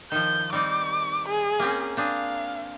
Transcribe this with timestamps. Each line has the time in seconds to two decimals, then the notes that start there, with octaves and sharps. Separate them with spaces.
0.12 D#3 F3 G6
0.53 G3 C4 D#4 D6
1.28 G#4
1.60 A#3 C4 C#4
1.97 C4 D4 G#4 F5